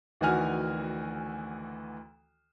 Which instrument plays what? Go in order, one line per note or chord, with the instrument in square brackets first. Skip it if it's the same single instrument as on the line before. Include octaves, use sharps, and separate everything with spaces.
[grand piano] D2 D#3 E3 F#4 G#5 F6